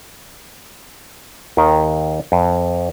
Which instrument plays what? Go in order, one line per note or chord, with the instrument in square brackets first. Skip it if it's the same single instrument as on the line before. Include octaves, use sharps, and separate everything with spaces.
[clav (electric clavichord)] D#2 D#3
F2